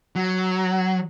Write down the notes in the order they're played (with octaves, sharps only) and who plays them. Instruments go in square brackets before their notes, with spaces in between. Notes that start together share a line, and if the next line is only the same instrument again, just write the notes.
[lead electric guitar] F#3